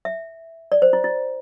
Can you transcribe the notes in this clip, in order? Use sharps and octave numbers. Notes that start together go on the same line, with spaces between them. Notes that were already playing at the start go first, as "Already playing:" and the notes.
E5
D5
C5
E4
E4